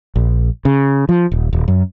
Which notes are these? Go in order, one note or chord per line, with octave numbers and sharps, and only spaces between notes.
A#1
C#3
F3
D#1
D#1
F#2